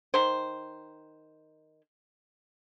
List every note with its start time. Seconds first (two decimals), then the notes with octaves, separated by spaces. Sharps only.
0.14 D#3 C5